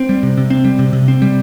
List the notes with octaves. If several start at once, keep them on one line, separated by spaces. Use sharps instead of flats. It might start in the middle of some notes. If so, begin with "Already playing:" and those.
Already playing: C4
G3
C3
C3
C4
G3
C3
C3
C4
G3